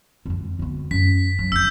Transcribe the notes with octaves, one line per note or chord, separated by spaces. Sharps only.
F2 D3
D2 B3
F#2 B6
F#3
F1 E6 G6